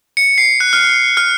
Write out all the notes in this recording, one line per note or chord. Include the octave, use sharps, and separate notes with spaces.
C#7
C7
F#6
F6
F6